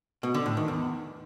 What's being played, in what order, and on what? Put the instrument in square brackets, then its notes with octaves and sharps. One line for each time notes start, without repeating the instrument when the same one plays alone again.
[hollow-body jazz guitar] B2
D3
A2
D#3
E2